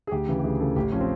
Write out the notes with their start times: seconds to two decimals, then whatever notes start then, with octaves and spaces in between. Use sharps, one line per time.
0.07 G#4
0.11 D2 G4
0.28 C#3 E3
0.39 G4
0.44 D2 G#4
0.60 C#3 E3 A4
0.76 A1 G4
0.92 F3 C#4
1.00 C4